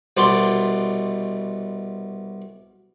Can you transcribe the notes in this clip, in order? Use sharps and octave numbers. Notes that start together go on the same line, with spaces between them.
C2 B2 D5 C6